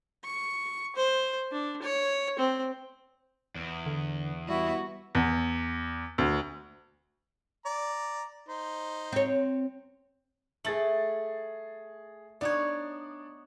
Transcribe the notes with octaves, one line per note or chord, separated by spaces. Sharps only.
C#6
C5
D4
C#5
C4
E2
D3
G3 B3 E4 F#4
E2
D2
D5 A#5
D#4 C5
C4 C#5
A3 G#4 A6 F#7
B3 D4 D#4 C#5 D5